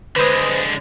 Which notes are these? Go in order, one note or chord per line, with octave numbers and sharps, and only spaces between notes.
D3 G#3 B4 C5 D#6